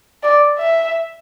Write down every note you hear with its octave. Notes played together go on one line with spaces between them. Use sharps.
D5
E5